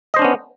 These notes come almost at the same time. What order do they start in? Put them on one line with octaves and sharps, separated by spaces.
D#5 C5 D4 C#4 B3